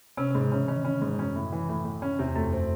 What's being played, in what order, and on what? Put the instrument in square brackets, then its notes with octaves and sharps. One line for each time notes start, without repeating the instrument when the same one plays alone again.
[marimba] C3 [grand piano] C#4
[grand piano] G#2 [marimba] C3
[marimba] C#3
[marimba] E3 [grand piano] C#4
[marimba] D#3 [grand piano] C#4
[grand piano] C#4
G#2
[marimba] F#2 [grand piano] C#4
[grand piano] A2
E3
A2
A2
C#4
[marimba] E2 [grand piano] C3
[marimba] F#2 [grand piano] A3
[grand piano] C4